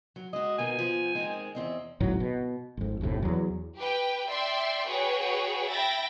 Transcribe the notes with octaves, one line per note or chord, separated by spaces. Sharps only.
F#3
G#3 F#4 D#5
B2 D#3 G#5
F3
D#3 G#3 C4
E2 C4 D#5
G#1 D2 A2 F#3
B2
G#1 F2
F#1 D#2 A2 C3
E2 F#3
G4 B4 G5
D5 E5 G5 C6
F#4 G#4 B4 C#5 G5
E5 G5 B5 A6 A#6